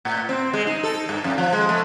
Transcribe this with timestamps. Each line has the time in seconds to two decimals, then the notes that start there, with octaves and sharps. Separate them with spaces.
0.05 A2
0.29 C4
0.53 G#3
0.67 D#4
0.83 A4
1.09 G2
1.24 F2
1.38 F3
1.52 G#3
1.69 A3